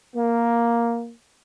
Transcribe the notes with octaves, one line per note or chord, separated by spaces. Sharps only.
A#3